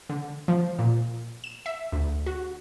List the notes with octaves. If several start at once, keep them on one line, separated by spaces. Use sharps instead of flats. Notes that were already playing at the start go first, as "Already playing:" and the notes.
D3
F3
A#2
E7
E5
D2
F#4